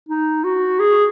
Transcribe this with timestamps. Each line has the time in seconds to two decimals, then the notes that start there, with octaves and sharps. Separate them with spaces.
0.09 D#4
0.44 F#4
0.80 G#4